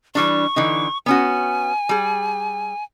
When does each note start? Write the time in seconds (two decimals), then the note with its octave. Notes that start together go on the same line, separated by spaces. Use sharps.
0.15 E3 G3 D4 C#6
0.56 D3 E3 D#4
1.06 B3 C#4 F#4 G#5
1.89 G3 G#4